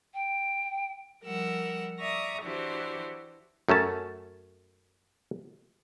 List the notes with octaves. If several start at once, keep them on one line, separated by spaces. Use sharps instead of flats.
G5
F3 G3 A#4 F#5 E6
D5 E5 A#5 C#6 D#6
E3 D4 E4 F#4 G4 C5
F#2 A3 C#4 A5